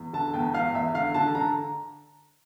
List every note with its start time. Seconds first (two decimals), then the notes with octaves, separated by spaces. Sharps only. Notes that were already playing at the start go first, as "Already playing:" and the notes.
Already playing: E2
0.13 D3 A5
0.34 E2 G5
0.54 E2 F5
0.75 E2 E5
0.94 D3 F5
1.14 D3 A5
1.35 D3 A#5